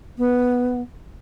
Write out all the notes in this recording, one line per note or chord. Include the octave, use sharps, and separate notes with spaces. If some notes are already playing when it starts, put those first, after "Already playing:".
B3